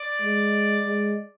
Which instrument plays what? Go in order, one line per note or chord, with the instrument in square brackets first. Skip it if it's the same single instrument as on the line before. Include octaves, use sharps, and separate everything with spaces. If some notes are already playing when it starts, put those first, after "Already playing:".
Already playing: [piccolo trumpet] D5
[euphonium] G#3
G#3